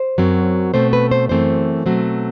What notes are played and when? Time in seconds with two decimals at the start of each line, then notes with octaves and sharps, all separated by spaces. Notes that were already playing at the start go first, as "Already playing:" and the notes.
Already playing: C5
0.18 F#2 F#3 C4
0.74 B2 A3 C4 C5
0.93 B4
1.11 C5
1.29 F#2 E3 A3 C4 C5
1.86 B2 F#3 A3 C4